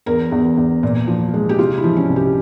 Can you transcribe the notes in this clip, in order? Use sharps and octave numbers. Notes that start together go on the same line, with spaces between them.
E2 A#4
E2
E2
A#2
F3
G#3
G4
C3 F4
E4
F3
C#4
C2
G4